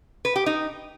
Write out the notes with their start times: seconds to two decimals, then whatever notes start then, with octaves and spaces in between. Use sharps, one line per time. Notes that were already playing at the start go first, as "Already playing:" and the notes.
0.25 B4
0.36 G4
0.46 D#4